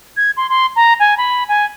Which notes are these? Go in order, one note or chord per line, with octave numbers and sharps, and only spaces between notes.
G#6
C6
C6
A#5
G#5
B5
G#5